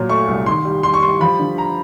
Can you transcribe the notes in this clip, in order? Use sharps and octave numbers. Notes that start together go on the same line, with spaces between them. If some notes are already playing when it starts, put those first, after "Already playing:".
Already playing: A#2 F#3
A3 C#6
C2
D#3 C6
G3
G3 C6
C#6
G3 C6
F3 B5
D3
A#5